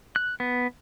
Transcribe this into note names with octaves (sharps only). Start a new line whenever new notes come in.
F#6
B3